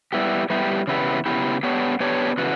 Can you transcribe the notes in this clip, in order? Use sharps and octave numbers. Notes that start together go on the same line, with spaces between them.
G3 B3 E4 G4
G3 B3 E4 G4
C#3 E3 B3 E4 G4
C#3 E3 B3 E4 G4
B3 D4 G4 C#5
B3 D4 G4 C#5
C#3 E3 B3 F#4